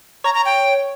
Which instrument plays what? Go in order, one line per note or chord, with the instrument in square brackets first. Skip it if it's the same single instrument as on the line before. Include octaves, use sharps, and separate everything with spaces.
[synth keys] C#5 [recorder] A#5
[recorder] A#5
G5